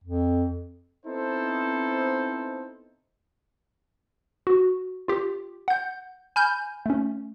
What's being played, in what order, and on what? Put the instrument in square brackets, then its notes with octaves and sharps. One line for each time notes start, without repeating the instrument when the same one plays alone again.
[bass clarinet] F2
[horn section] B3 C4 D#4 E4 A4 C5
[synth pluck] F#4
F4 G4
F#5 G6
G#5 B5 F6 G6
A3 C#4